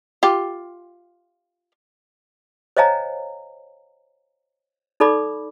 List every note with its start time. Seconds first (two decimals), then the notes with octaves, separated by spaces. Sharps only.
0.23 F4 G4
2.77 C5 C#5 D#5 F5 G#5 A#5
5.00 D#4 A4 D5 B5 D6